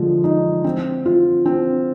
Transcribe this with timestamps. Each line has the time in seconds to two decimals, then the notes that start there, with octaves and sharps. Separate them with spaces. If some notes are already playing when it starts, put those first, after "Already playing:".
Already playing: D3 F3 G#3
0.24 D#4
0.64 C4
1.06 F4
1.46 C4